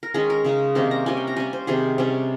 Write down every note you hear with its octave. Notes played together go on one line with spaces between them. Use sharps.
A#4
D#3 G#3 C#4 G#4
A#4
C#3 G#3 D#4
C3 D#3 A#3 C#4 C5
A#5
C3 G3 C#4 G#5
G5
A#5
G3 C#4 G#5
C5
C3 D#3 G3 G#4
C3 G3 C#4